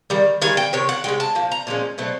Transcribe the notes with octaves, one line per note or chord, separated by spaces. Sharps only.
D#3 G3
D#3 G3 G#5
G5
C3 D#3 C#5
F#5
C3 D#3 G#3 G5
A5
A#2 F3
A#5
A#2 F3 G#3 C#4
B2 F#3 A3 C4